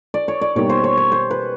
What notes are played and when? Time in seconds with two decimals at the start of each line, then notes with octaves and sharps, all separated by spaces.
0.14 D5
0.28 C#5
0.41 D5
0.55 B2 G3 A#3 D#4 G4 C#5
0.69 C5
0.84 C#5
0.97 C#5
1.12 C5
1.31 B4